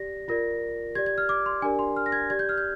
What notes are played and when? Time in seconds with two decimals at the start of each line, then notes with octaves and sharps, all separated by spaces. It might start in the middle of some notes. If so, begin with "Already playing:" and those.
Already playing: G4 D5 A#6
0.28 F4 A#4 D5 A#6
0.95 G4 G#6
0.98 D5
1.06 G#6
1.18 F6
1.29 D6
1.46 C6
1.62 D4 G4 A#4 D5 G#5
1.79 C6
1.96 F6
2.06 A#6
2.12 G#6
2.30 G4 D5 G#6
2.39 G6
2.49 F6
2.58 G6